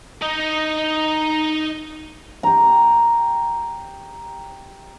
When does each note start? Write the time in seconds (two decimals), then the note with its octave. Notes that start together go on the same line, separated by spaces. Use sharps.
0.22 D#4 D#5
2.43 G4 A#5